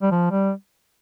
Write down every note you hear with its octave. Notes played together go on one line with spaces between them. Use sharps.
G3
F3
G3